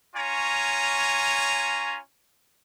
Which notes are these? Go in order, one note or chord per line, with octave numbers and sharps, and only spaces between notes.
C#4 F4 C#5 G#5 A#5